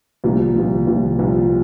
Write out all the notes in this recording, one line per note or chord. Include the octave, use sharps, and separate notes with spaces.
C2 A#2 F3
C2 A#2 F3
C2 A#2 F3
C2 A#2 F3